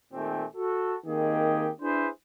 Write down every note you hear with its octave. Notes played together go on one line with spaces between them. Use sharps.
A#2 D#3 A3 C4 G4 G#5
F#4 A4
D#3 A#3 C4 G4 G#4 D#5
D4 E4 G#4 B4 C5 E5